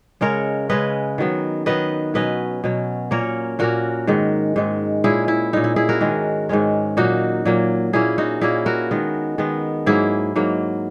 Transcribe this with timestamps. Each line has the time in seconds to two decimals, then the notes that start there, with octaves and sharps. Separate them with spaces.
0.21 C#3 G#3 C#4 A#4 C#5
0.69 C#3 G#3 C#4 B4 D#5
1.18 D#3 F#3 B3
1.66 D#3 F#3 B3 B4 D#5
2.14 B2 F#3 C#4 B4 D#5
2.64 B2 F#3 C#4
3.11 A#2 A#3 C#4 A#4 C#5
3.59 A#2 A#3 C#4 F#4 A#4
4.07 G#2 D#3 G#3
4.56 G#2 D#3 G#3
5.04 A#2 G#3 C#4 E4 G#4
5.28 E4
5.53 A#2 G#3 C#4 D#4
5.64 E4
5.76 E4 G#4
5.89 F#4 A#4
6.01 G#2 D#3 G#3 C#4
6.49 G#2 D#3 G#3 C#4
6.97 A#2 F#3 A#3 D#4 F#4
7.45 A#2 F#3 A#3
7.93 A#2 A#3 C#4 E4 G#4
8.18 D#4 F#4
8.41 A#2 A#3 C#4 E4 G#4
8.66 F#4 A#4
8.91 D#3 G#3 B3
9.38 D#3 G#3 B3
9.86 G#2 F#3 A#3 E4 G#4
10.36 G#2 F#3 A#3